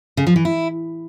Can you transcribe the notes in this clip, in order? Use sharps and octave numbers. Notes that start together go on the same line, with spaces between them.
C#3
F3
E3
E4